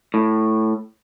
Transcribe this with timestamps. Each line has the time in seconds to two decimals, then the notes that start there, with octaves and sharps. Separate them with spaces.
0.14 A2